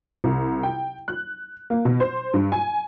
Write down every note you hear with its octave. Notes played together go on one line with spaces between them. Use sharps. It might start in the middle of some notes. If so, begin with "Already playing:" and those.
C2
G5
F#6
A#3
B2
C5
G2
G#5